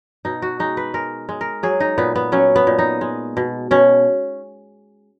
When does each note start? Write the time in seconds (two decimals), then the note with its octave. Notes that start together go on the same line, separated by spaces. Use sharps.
0.25 B2 D#4
0.42 F#4
0.59 G#3 D#4
0.77 B4
0.94 G#3 A#4
1.29 G#3
1.41 A#4
1.63 F#3 G#4
1.80 D#4
1.98 A#2 B3
2.16 B3
2.32 F#3 C#4
2.56 B3
2.67 A#2
2.79 D#4
3.01 G#3
3.37 B2
3.71 B2 C#4